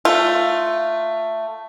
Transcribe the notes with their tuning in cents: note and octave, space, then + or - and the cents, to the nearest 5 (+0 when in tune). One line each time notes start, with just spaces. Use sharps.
A3 +10 F4 +0